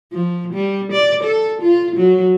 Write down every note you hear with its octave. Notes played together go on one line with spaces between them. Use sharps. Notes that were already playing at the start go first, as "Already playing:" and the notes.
F3
G3
D5
A4
F4
F#3